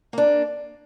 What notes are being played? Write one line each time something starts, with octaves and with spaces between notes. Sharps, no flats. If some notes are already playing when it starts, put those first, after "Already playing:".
A#3 D4